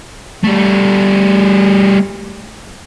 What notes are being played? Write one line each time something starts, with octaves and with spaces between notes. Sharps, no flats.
G3 A3